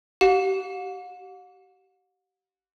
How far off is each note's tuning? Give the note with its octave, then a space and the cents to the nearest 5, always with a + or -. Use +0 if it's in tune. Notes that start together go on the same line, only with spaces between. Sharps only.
G4 -35 F#5 -45